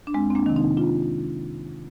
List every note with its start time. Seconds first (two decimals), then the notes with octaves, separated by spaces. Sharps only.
0.07 D4
0.14 F2 G#3 C4
0.30 C4
0.35 A#3 D4
0.46 C3 D#3
0.56 C4 D#4
0.77 D4 F4